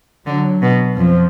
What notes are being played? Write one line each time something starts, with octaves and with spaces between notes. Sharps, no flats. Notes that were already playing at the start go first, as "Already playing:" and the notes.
D3 F#3
B2
F2 F3